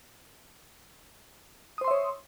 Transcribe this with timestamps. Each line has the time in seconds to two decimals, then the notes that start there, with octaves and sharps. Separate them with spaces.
1.78 D#6
1.81 C5
1.84 C6
1.88 E5
1.91 C#5